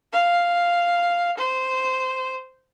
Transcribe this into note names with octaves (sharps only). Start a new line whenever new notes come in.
F5
C5